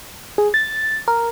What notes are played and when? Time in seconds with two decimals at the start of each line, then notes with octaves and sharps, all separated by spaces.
0.38 G#4
0.54 A6
1.08 A#4